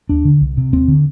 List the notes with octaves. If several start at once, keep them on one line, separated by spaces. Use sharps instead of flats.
D#2 D4
D3
C2
C3
D#2 C4
D3